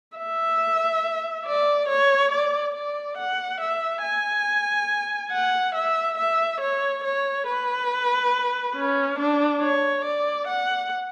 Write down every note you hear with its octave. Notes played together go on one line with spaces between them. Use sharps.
E5
D5
C#5
D5
D5
F#5
E5
G#5
F#5
E5
E5
C#5
C#5
B4
C#4
D4
C#5
D5
F#5